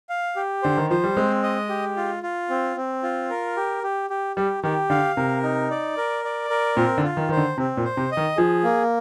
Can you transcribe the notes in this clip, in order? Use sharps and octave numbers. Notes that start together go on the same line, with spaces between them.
F5
G4
D3 C5
D#3
F3 C5
G3
G#3 C4
D#5
G4
F4
F4
C4
C4
F4
A#4
G4
G4
G4
G3 G4
D#3 G4
D3 F5
C3 A#4
D#4
D5
A#4
D5
A#4
A#2 C4
D3
F4
D#3
D#3 C5
D3
C3 C4
A#2
C5
C3
D#5
D#3
F3 G#4
A#3